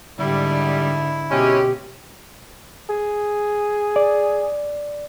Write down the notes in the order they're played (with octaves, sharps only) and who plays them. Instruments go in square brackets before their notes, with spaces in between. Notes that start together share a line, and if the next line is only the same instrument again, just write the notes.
[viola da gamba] G#2 D3 [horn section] G3 [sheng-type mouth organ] E4
[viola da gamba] B2 [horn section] G#3 C4 C#4 [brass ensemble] G4
[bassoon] G#4
[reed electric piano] D5